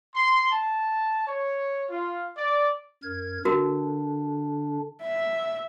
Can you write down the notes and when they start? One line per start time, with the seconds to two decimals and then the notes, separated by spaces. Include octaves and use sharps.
0.15 C6
0.50 A5
1.26 C#5
1.90 F4
2.36 D5
3.03 F#2 A#4 G#6
3.45 D3 D4 F#4 A#4
5.02 E5